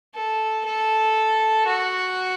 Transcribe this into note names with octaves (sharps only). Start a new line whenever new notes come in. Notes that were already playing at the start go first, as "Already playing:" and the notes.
A4
A4
F#4